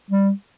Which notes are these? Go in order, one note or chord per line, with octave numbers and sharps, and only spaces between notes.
G3